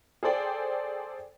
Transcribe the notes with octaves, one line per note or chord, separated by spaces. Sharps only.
G#4 A4 C5 D5 G5